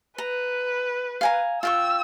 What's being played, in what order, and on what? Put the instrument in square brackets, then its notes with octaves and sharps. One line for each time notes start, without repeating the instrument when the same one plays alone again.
[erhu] B4 [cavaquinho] A#5
[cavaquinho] F5 G#5 A#5
[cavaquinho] F4 G5 C#6 [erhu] E6